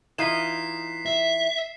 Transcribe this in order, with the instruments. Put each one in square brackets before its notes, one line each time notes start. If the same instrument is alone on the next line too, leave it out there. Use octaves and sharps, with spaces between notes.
[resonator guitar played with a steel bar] E3 D#4 F4 [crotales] B6 C7 E7
[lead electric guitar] E5